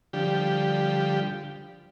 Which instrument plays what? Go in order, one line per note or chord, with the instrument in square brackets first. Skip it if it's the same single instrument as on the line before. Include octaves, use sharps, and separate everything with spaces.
[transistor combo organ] D3 F3 G3 G4